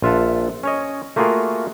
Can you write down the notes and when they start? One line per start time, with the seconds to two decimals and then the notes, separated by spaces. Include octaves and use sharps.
0.02 A#1 F4 E5 F#5 A5
0.63 C#4 C#5 D#5
1.16 A3 A#3 F4 F#4 G#4 A#4